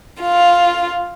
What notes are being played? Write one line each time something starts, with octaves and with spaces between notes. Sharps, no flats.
F4